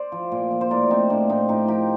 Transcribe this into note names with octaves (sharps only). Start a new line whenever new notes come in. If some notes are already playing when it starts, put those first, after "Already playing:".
Already playing: C5 D5
F3
A#2
F3
C5
A2 A#4 D5
A2 C4 D#4
A2 A#3 D4
A2 C4 D#4
A2 D#4 G4
F3 G4 A#4